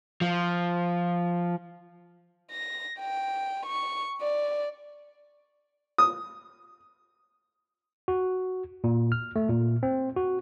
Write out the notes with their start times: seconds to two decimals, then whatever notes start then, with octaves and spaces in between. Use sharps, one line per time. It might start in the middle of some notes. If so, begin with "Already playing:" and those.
0.21 F3
2.51 A#6
2.99 G5
3.66 C#6
4.21 D5
5.98 D#6
8.08 F#4
8.84 A#2
9.12 F6
9.36 A3
9.49 A#2
9.83 C4
10.16 F#4